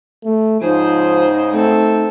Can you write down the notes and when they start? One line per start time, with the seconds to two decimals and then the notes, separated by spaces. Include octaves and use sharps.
0.24 A3
0.61 G#2 C#3 F3 D#4 G#4 C5 D#6
1.53 A3 C4 A4